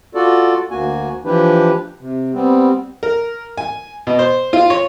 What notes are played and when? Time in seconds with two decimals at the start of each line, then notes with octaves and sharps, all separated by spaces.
0.15 F4 F#4 A4 D5
0.71 D2 A#3 F#4 G#5
1.25 E3 F3 D4 E4 G4 B4
2.01 C3
2.34 G3 B3 C4
3.03 A#4
3.58 G#5
4.07 B2
4.19 C5
4.53 F4
4.70 C#5